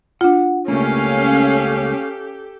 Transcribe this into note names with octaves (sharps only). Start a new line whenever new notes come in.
D4 F4 F#5
C#2 A3 A#3 C#4 G4 A4 F5